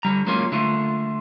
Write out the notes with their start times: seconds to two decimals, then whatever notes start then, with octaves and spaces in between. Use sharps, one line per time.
0.03 D3 G3 A#5
0.27 F#3 G#3 A#3 C#4 F4 G#4
0.52 D3 A3 F4